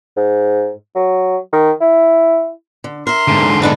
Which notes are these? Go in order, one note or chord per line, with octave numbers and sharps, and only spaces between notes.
G#2
F#3
D#3
E4
D3
A#4 E5 C6
G#2 D3
B3 D4 D#4